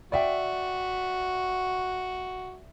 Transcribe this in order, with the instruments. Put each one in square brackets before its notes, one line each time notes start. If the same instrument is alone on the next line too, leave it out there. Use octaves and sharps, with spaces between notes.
[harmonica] F#4 [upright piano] D5 E5 G5